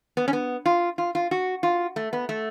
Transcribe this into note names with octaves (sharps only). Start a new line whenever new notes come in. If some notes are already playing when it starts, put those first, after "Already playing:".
B3
C#4
B3
F4
F4
F4
F#4
F4
A3
B3
A3